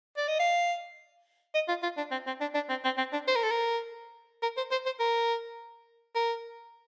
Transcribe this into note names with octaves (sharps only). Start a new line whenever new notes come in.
D5
D#5
F5
D#5
F4
F4
D4
C4
C4
D4
D4
C4
C4
C4
D4
C5
A#4
A4
A#4
A#4
C5
C5
C5
A#4
A#4